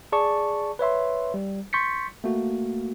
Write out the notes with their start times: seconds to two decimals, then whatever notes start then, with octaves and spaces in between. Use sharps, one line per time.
0.12 G#4 D5 A5 C#6
0.79 B4 C#5 E5 C6
1.34 G3
1.73 C6 C#6 G6 A6 B6 C#7
2.24 A3 A#3 F#4